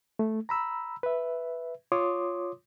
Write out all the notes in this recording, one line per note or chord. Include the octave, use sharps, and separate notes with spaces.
A3
A#5 B5 E6
B4 E5
F4 C#5 C6 D6 D#6